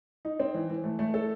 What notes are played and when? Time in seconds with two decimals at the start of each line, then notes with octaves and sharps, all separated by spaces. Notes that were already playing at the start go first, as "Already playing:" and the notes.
0.25 D#4
0.40 C4
0.54 E3
0.70 E3
0.84 A3
0.99 A3
1.14 A4